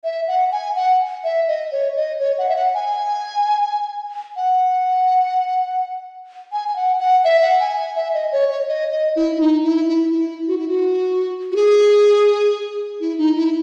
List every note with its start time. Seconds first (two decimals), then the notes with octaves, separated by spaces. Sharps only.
0.04 E5
0.28 F#5
0.52 G#5
0.76 F#5
1.24 E5
1.48 D#5
1.72 C#5
1.96 D#5
2.20 C#5
2.38 F#5
2.49 E5
2.56 F#5
2.74 G#5
4.36 F#5
6.52 G#5
6.68 G#5
6.76 F#5
7.00 F#5
7.24 E5
7.42 F#5
7.60 G#5
7.78 G#5
7.96 E5
8.14 D#5
8.32 C#5
8.50 C#5
8.68 D#5
8.92 D#5
9.16 E4
9.36 E4
9.41 D#4
9.64 E4
9.88 E4
10.12 E4
10.48 F#4
10.58 E4
10.68 F#4
11.52 F#4
11.56 G#4
13.01 E4
13.18 D#4
13.36 E4